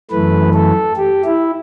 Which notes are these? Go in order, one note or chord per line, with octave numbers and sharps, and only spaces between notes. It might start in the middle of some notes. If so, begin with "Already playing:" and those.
F#2 E3 A3 B4
A4
G4
E4